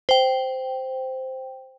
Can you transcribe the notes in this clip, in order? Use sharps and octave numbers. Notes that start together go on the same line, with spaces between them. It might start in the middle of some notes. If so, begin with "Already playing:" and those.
C5 G5